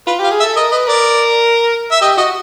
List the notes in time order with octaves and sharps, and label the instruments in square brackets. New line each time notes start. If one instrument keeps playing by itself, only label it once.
[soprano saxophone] F4 [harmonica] B4
[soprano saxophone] G4 [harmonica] F5
[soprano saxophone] G#4
[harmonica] E5
[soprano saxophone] A4
[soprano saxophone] A#4 [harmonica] D#5
[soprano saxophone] B4 [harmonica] D#5
[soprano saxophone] A#4 [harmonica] D5
[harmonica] E5
[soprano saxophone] G4 [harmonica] D#5
[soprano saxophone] F#4 [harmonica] D#5